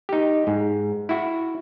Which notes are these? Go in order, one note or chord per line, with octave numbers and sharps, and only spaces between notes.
D#4 G4
G#2
E4 F#4